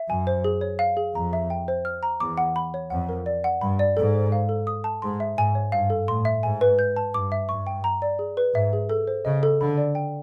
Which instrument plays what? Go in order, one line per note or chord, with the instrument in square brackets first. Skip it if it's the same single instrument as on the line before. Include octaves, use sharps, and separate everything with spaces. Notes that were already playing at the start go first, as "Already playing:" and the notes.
Already playing: [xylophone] E5
[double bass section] F#2 [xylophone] G#5
[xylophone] C5
G#4
C#5
F5
G#4
[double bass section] F2 [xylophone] A#5
[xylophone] E5
G5
C5
F6
A#5
[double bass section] E2 [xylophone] D6
[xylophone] F#5
B5
C#5
[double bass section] F2 [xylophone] F#5
[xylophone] A#4
D5
F#5
[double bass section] G2 [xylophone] B5
[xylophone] D5
[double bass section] G#2 [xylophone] A4
[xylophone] C5
F5
A4
D#6
A5
[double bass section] G#2 [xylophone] C6
[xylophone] E5
[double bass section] G#2 [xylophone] G#5
[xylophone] C#5
[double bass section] G2 [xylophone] F5
[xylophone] A4
[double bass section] A2 [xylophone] C6
[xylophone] E5
[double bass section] G#2 [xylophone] G#5
[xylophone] B4
G6
A5
[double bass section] G2 [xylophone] D6
[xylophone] E5
[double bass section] G2 [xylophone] C#6
[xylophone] G5
A#5
D5
G#4
B4
[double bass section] G#2 [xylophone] E5
[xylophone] G#4
A4
C5
[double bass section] C#3 [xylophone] D#5
[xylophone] A4
[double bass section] D3 [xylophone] B5
[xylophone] D5
G5